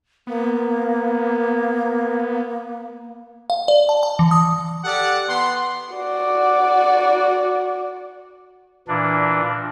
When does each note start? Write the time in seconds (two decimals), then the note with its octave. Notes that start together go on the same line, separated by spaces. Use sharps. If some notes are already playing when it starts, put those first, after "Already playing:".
0.27 A#3 B3
3.50 F5
3.68 D5
3.89 A5
4.03 A5
4.19 E3
4.31 D#6
4.84 G4 A4 D5 F#5
5.28 B3 F#5 C6
5.94 F#4 D5
8.88 A#2 E3 D4